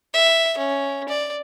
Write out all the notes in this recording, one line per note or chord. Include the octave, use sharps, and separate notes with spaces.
E5
C#4
D5